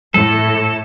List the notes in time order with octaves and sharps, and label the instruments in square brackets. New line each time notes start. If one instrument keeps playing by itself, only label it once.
[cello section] A2 [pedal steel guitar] A4